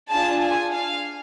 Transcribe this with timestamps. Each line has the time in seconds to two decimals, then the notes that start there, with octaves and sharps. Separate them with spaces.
0.10 D4 F4 G#4 A5
0.43 G#5
0.73 F5